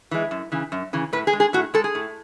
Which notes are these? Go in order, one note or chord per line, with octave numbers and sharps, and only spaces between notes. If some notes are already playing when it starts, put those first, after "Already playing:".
E3 G#3
F#2
C#3 E3
F#2
C#3 E3
A2 B4
G#4
G#3
G#4
A2 F#4
G#3 A4
G#4
A2